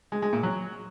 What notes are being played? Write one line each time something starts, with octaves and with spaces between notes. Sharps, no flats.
G#3
G#3
A#2
F#3